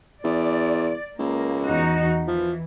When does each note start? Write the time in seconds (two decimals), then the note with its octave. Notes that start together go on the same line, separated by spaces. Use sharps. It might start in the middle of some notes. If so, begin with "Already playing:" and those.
0.24 E2 D5
1.19 C#2 A#3
1.67 E2 D#4 F#4
2.27 E3 F3